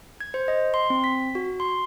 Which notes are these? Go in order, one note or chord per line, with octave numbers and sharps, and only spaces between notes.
G#6
C5
D#5
C6
C4
B6
F#4
C6